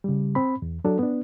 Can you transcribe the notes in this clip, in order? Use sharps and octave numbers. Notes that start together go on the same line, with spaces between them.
C#3 G3
C4 B5
E2
F#3 D4 A4
B3 D4